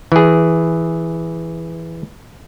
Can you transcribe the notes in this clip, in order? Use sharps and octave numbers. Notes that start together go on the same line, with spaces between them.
E3 G#4